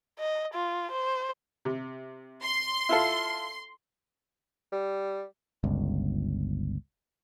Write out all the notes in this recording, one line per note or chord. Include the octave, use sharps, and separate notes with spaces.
D#5
F4
C5
C3
C6
E4 F4 A4
G3
G1 C#2